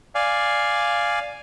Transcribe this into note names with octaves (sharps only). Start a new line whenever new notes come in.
D5 F5 G#5